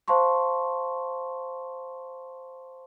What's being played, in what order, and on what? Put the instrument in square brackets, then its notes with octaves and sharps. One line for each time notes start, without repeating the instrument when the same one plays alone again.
[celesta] C5 F5 A5 C6 C#6